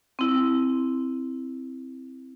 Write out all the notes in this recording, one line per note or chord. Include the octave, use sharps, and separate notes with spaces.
C4 E4